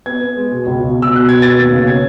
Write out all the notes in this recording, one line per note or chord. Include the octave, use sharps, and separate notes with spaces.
B3 G#6
B3
G#3
B2
C#2
B2
B2
E6
B2 F#6
B2 G#6
B3 A6
D#2
C#3
C#4 G#6